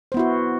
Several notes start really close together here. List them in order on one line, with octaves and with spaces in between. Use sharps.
C5 B3 E4 F#4